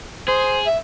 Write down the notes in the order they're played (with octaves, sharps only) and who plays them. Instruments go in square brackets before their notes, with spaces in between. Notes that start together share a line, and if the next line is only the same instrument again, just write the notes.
[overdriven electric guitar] G#4 [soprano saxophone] C5
[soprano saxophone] E5